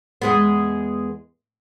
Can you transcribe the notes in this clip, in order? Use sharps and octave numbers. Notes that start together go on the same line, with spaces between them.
E2 G#3 B3